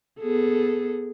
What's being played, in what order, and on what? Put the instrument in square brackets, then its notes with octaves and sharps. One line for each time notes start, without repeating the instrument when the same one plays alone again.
[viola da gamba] B3 G#4 A4